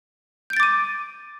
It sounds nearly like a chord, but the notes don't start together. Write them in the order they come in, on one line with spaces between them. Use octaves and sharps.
G6 D7 A6 D6 D#7